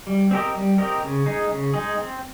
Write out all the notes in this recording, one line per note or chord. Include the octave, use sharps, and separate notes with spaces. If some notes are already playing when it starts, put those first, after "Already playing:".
G3
C4 G4 A#4 D#5
G3
C4 G4 A#4 D#5
C#3
G#3 D#4 G#4
C#3
G#3 D#4 G#4
C4